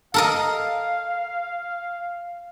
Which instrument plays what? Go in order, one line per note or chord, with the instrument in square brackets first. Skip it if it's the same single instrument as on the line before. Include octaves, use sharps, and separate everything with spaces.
[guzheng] A4 A#4 D#5 [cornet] F5